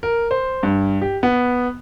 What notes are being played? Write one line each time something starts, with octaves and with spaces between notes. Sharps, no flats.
A#4
C5
G2
G4
B3